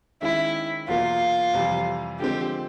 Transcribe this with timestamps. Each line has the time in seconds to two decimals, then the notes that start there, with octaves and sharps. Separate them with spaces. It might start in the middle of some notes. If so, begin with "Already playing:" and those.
0.22 D#3 G#3 C#4 E4
0.88 E2 B2 F#3 A#3 F4
1.54 F2 C3 E3 G3
2.19 D3 F3 G#3 C4 G4